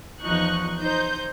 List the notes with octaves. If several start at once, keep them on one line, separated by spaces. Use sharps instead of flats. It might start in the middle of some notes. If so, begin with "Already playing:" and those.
E2 F3 D#4 C#6 F#6
D#4 C5 G6